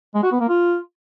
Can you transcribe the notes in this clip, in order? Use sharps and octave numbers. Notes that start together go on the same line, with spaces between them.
G#3
F#4
B3
A#3
F4